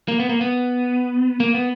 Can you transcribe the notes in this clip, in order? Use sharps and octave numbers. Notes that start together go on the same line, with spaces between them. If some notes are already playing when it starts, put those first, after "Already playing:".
A#3
B3
A#3
B3
A#3
B3